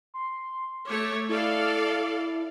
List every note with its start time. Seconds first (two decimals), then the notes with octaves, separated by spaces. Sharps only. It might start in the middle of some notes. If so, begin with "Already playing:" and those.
0.14 C6
0.87 A3 C#5 D6
1.29 E4 A4 D5 F5